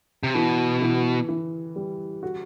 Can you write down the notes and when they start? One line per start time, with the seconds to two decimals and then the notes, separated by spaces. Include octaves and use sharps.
0.23 C3
0.34 B2 E3
0.82 E3
1.29 E3
1.76 G3
2.23 F#4